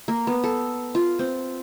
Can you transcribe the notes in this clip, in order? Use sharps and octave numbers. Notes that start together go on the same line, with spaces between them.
A#3
B3
A4
F4
C4